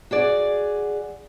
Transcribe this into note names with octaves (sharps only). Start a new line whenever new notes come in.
F#4 G#4 D5